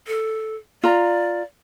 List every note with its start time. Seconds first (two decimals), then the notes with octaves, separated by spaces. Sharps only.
0.07 A4
0.83 F4 D5 A#5